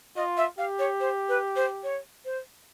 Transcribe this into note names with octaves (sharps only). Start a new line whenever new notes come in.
F4 D#5
E5
G4 F5
C#5
C5
B4
C5
C#5
C5